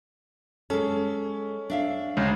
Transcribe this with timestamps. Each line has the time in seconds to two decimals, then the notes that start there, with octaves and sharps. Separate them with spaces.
0.70 G#3 C#4 A4
1.70 D4 E5 F5
2.17 D2 C#3 G#3